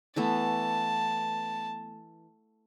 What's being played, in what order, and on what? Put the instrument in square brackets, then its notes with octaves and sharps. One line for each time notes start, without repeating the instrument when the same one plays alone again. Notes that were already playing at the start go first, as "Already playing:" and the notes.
[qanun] E3 A3 B3 [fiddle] A5